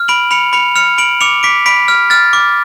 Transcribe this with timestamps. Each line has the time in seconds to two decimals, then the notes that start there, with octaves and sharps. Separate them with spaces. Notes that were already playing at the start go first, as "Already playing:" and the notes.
Already playing: F6
0.08 B5 D7 F#7
0.31 B5 C#7 F7
0.53 B5 C#7 F7
0.75 F6 C#7 F7
0.98 B5 D7 F#7
1.21 D6 C#7 F7
1.43 D6 B6 D7
1.66 B5 B6 D7
1.88 F6
2.10 F6 A6
2.33 D6